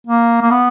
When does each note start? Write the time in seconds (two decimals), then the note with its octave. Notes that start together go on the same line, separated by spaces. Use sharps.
0.07 A#3
0.42 A#3
0.51 B3